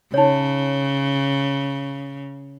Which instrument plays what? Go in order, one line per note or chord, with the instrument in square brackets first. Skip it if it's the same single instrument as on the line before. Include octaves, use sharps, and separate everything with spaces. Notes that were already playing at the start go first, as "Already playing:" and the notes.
[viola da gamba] C#3 [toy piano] D#4 C#5